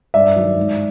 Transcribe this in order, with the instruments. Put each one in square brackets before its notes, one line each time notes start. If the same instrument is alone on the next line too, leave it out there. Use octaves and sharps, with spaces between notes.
[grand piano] G2 D5 E5
D#3 F#3
G#2